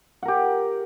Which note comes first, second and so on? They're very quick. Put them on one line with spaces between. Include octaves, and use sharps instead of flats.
F#5 A#4 G4